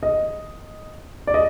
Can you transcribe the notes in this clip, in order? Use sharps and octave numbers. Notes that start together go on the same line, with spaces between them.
D#5
D5
D#5